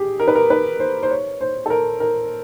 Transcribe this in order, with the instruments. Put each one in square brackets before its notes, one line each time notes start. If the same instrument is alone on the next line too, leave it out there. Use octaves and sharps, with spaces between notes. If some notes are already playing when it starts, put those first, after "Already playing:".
Already playing: [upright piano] G4 G#4
A#4
B4
A#4
B4
C5
C5
C#5
C5
A4
A#4
A#4